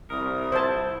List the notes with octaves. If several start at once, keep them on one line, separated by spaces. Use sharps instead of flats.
C2 A#4 D#6
E4 C5 A5